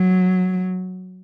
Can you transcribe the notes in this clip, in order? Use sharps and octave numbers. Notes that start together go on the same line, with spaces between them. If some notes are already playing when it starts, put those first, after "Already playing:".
Already playing: F#3